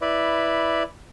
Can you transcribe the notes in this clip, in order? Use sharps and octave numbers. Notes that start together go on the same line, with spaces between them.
E4 B4 D5